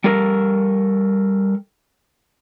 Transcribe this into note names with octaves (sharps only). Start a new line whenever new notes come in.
G3 A4 A#4